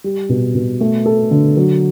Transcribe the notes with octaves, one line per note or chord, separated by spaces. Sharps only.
G3
B2
B2
A3
A4
D3
F#3